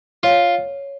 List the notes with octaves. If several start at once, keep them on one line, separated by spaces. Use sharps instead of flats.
F4 C#5